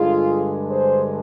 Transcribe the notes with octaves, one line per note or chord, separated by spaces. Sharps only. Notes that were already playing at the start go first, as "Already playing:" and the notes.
Already playing: G2 D3 G#3 F4 G#4
G#4 C5